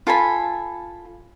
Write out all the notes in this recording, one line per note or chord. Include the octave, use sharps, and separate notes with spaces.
F4 A4 G#5 B5